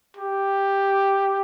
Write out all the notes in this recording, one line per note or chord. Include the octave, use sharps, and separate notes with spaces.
G4